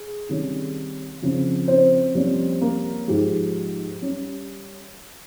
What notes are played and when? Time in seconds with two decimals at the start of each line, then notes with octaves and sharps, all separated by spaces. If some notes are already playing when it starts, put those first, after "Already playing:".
Already playing: G#4
0.29 C3 D#3 G3 C#4
1.22 F2 C#3 F3 C4
1.68 C4 C5
2.15 F2 C3 G3 A#3 C#4
2.61 A#3 A#4
3.08 G#2 F3 G#3 G4
4.02 G3 C#4